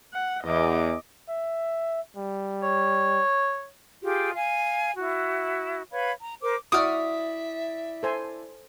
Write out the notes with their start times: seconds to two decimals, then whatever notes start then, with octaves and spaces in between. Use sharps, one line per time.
0.13 F#5
0.43 E2 D#5 D6
1.29 E5
2.17 G3
2.63 C#5
4.01 F4 G4 G#4
4.35 F5 G#5
4.96 E4 F#4
5.92 B4 C#5 F5 B5
6.22 A#5
6.41 A#4 C5 D6
6.72 E4 F#4 D5 E5 D6 D#6 F6
8.03 A4 C5 G#5